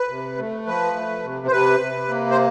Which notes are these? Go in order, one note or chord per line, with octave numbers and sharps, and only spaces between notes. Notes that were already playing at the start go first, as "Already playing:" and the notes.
Already playing: B4
C3
A3
F3 B4
A3
C3
C5
C3 B4
C3
A#3
C5